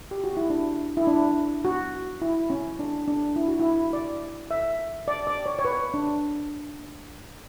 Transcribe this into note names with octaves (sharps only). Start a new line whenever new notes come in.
G4
F#4
E4
D4
E4
D4
F#4
E4
C#4
D4
D4
E4
F#4
E4
D5
E5
D5
D5
C#5
C#5
B4
D4